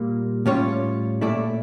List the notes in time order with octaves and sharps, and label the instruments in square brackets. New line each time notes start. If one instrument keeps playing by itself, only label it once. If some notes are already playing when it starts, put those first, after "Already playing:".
Already playing: [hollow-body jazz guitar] A#2 G3 A#3
A2 G3 C#4 F4 C#5
A#2 A3 E4 A4 D5